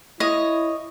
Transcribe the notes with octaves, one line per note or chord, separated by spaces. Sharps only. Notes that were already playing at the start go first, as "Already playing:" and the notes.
E4 C#5 D#5